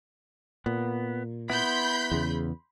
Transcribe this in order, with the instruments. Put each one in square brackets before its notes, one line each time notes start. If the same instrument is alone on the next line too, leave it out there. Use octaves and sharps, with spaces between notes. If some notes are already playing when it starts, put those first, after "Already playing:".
[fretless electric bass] A#2 [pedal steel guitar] B3
[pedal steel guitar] B3 E4 [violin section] B5 C6 G6
[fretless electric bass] E2 C#3